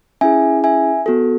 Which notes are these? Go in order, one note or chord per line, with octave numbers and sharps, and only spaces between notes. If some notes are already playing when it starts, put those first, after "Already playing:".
C#4 E4 G#4 E5 G#5
E5 G#5
B3 F#4 A4